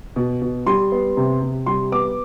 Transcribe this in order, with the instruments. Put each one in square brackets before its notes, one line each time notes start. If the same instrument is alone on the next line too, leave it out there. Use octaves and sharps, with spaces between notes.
[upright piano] B2
B2
G3 C6
B3
C3
C3
G3 C6
B3 D6